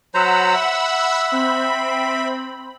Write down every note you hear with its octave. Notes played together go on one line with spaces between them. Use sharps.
F#3 C5 F#5 A#5 B5 E6
E5
C4 B5